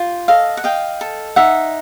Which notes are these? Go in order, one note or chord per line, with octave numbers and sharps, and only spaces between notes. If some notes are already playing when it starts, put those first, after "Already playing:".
Already playing: F4 G4
A4 D#5 F5
F#5
D#5 F5 G5
A4
D#4 E5 F#5